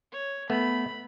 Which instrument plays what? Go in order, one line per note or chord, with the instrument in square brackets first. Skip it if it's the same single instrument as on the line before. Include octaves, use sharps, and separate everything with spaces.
[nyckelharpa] C#5
[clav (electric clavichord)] A3 B3 [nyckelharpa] B5